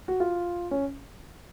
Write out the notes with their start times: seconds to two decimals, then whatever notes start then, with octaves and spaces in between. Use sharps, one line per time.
0.08 F#4
0.20 F4
0.71 C#4